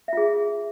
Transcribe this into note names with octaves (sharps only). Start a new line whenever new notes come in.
F4 G#4 E5